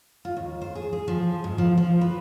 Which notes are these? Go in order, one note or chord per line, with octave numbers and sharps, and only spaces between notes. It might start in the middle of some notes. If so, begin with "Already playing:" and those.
F4
D#2
C5
G#4
G#4
F3
G#2
F3
F3
B4